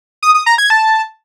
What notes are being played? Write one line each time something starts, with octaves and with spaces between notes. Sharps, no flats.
D#6
D#6
A#5
G#6
A5